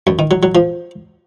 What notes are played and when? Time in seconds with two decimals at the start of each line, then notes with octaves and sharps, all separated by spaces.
0.07 F#2
0.19 D#3
0.31 F#3
0.43 F#3
0.55 F3